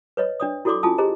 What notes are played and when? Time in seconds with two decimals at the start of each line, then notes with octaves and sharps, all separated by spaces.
0.17 B4 C#5 D#5
0.40 D4 D5 D#6
0.65 E4 F#4 A4 D5 C6 D6
0.83 C#4 E4 F4 G#5 A5 D#6
0.98 G4 G#4 C5 D#5 A#5